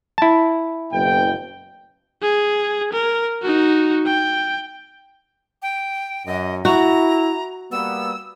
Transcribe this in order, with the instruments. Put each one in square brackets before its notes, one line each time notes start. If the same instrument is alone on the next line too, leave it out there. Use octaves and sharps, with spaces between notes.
[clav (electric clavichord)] E4 A5
[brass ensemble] F#1 B2 G5
[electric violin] G#4
A#4
D#4 F#4
G5
[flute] G5
[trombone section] F#2 [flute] D#5
[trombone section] E4 [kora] F#4 [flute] A#5
[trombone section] G3 A#3 B3 [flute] E6